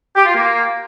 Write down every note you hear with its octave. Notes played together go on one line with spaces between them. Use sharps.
G4
F4
A#3